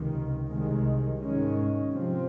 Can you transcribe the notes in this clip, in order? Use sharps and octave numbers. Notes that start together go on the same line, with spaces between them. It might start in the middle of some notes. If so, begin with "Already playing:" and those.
Already playing: C#2 C3 D#3
C2 C3 D#3 G#3
G#2 D#3 G#3 C#4
C3 F3 C4